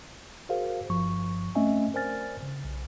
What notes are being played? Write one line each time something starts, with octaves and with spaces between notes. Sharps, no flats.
F#4 G#4 A#4 C5 F5
G1 G2 F3 C#6
A3 C4 C#4 D#5 E5 G#5
A#4 C5 D5 G#5 F6 A6
C#3
B1